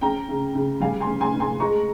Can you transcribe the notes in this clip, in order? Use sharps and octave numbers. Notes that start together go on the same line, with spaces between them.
C#4 G5 A#5
C#3
C#3
G3 F5 G#5
G#5 C6
C#4
G#5 C6
G2
G#5 C6
G#3 A#5 C#6